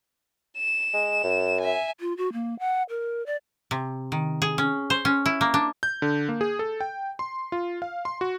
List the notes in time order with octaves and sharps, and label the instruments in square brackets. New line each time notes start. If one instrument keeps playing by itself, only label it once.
[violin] E7
[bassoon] G#3
F#2
[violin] E5 G#5
[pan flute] F4
F#4
A#3
F#5
A#4
D5
[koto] C3
D#3
G#4
C#4
C5
C#4
E4
A#3
D4
[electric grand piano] G6
D3
A#3
G#4
A4
G5
C6
F4
F5
C6
F#4